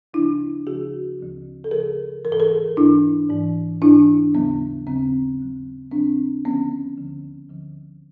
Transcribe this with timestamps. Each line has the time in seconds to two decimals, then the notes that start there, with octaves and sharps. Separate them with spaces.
0.14 D2 C#3 F3 D4 E4
0.66 D2 C#3 F3 F#4 G#4
1.19 D2 C#3 F3
1.64 A4
1.71 D2 C#3 F3 G#4 A#4
2.24 E3 A#4
2.28 G#2 A4
2.40 G#4 A#4
2.77 G#2 E3 D4 E4
3.29 G#2 E3
3.82 G#2 E3 D4 E4
4.35 D#2 C#3 F#3 B3
4.87 D#2 C#3 F#3 C4
5.40 D#2 C#3 F#3
5.91 D#2 C#3 F#3 C4 D4
6.45 D2 D3 F3 B3 C#4
6.97 D2 D3 F3
7.50 D2 D3 F3